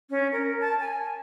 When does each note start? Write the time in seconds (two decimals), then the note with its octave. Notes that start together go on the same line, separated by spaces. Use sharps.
0.10 C#4
0.32 A#4
0.60 A5
0.80 G#5